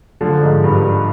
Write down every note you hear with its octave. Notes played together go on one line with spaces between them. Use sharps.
D3 F3
G#2
G2